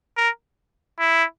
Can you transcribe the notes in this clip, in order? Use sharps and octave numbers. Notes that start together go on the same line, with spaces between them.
A#4
E4